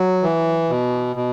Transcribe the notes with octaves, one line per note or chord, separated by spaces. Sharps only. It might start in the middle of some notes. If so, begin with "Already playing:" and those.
Already playing: F#3
E3
B2
B2